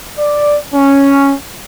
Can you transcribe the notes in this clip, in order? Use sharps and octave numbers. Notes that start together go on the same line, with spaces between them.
D5
C#4